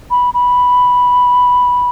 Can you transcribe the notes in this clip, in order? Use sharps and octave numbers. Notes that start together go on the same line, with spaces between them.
B5
B5